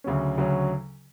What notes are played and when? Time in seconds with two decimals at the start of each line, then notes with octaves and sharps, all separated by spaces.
0.04 D2 C#3 F#3 C#4
0.38 D2 C#3 F#3 C#4